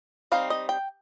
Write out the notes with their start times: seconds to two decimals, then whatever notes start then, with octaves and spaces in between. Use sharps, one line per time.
0.32 G3 C4 D#4 F5
0.50 D#5
0.69 G5